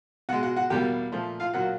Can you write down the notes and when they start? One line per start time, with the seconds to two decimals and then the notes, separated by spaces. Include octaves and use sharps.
0.29 B2 G#3 F#4 F#5
0.43 F#4 F#5
0.56 F#4 F#5
0.70 E2 B2 G3 A#3 G4 G5
1.12 A#2 F3 A3
1.40 F4 F5
1.53 A#2 F#3 A#3 F#4 F#5